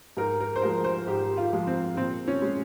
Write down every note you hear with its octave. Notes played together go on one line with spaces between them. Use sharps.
G#2 A#4
A#4
C5
F3 G#3 A#4
C5
G#2 G4
F4
F3 G#3
C4
A#2 C4
C#4
G#3